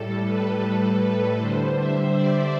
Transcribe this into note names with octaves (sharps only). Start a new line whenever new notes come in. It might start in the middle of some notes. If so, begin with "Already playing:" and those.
Already playing: A2 G3 A4
B4
B4
D3 G3 C5
E5
D5